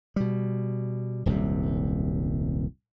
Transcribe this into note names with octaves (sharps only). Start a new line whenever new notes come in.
B2 G3
D#1 C2 F#2 C3